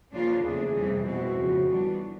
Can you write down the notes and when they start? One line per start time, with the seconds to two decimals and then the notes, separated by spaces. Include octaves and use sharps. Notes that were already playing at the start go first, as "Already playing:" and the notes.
0.12 C#3 F3 A#3 D4 F4
0.43 E2 C#3 F3 A3 D4 G#4
0.74 F2 C3 E3 G3 C4
1.05 B2 G#3 C4 E4 F#4
1.37 F2 C#3 F3
1.67 E3 G3 B3 D4